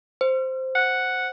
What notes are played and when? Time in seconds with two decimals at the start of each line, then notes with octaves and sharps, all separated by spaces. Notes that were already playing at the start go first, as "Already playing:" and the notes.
0.21 C5
0.75 F#5